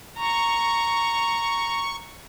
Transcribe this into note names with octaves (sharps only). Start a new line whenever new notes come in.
A#5 C#6